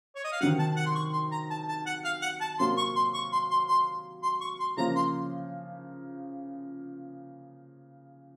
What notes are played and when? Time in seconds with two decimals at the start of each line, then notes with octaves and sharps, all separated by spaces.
0.15 C#5
0.24 D#5
0.32 F5
0.41 C3 D#3 F#3 F#5
0.59 A5
0.76 F#5
0.86 C6
0.95 C#6
1.13 C6
1.32 A#5
1.50 A5
1.68 A5
1.86 F#5
2.05 F5
2.22 F#5
2.41 A5
2.59 C3 F#3 A#3 C6
2.77 C#6
2.96 C6
3.14 C#6
3.32 C6
3.50 C6
3.68 C6
4.23 C6
4.41 C#6
4.60 C6
4.77 C#3 F3 A#3 A#5
4.96 C6